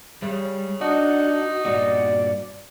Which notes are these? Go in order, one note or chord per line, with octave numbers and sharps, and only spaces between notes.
C#3 G3
D4 D#4 F#4
G2 A#2 F#4 D5